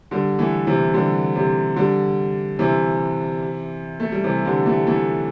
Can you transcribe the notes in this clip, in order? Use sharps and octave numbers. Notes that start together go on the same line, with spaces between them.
D3 G3
E3 A3
C3 E3
D3 G3
C3
D3 G3
C3 E3
A3
G3
C3 E3
D3 G3
E3 A3
E3 A3